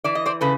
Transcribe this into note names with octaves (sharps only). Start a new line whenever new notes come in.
E3 D5
D#5
C5 D5
C#3 A4 B4